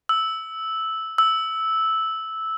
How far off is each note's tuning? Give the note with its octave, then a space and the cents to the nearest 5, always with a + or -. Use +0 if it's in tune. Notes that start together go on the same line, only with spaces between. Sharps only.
E6 -10
E6 -10